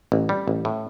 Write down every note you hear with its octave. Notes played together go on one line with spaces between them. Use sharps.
A1
G3
A1
A2